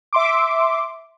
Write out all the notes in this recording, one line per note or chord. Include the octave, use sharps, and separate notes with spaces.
E5 C6 D6